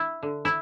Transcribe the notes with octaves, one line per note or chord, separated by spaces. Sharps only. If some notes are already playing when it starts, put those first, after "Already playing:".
Already playing: E4
D3
E4